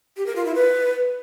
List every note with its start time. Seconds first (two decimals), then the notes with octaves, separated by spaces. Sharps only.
0.17 G4
0.26 A#4
0.36 F4
0.45 E4
0.55 B4